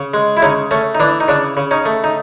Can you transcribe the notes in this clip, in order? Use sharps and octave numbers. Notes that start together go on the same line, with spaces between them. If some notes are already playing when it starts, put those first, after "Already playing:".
Already playing: C#3
G#3
E4
C#3 C#4 D#4
A3 C#4
D#4
E3 D4
D#4
C#3 D4
C#3
C#4 D#4
A3
D#4